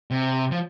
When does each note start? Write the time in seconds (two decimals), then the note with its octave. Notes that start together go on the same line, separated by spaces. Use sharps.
0.11 C3
0.51 F3